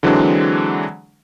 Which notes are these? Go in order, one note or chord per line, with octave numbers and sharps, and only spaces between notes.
D3 E3 F#3 G#3 C4 D4